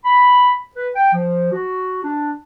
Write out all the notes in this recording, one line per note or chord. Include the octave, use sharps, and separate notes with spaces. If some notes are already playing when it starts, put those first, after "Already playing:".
B5
B4
G5
F3
F#4
D4